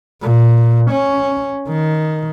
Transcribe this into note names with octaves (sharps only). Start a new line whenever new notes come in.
A#2
C#4
D#3